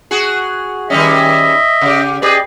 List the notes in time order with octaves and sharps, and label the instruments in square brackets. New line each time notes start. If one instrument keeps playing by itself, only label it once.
[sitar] F#4 G#4
[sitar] D#3 G3 C#4 [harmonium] D#5 E5
[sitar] C#3 G4
[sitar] G4 G#4 B4 [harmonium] D5 D#5